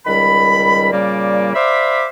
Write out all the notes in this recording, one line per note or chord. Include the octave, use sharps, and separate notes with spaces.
C#2 D#3 G3 B5
A#2 C#3 G3 A#3 D5
C5 D5 E5 F5 B5 D6